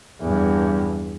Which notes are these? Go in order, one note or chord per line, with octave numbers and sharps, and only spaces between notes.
E2 G2